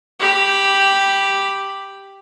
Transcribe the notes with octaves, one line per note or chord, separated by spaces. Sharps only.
G4 B5